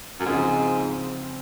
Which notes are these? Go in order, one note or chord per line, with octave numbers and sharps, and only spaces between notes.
F#2
C#2 G#2 C#3 F3 C4 F4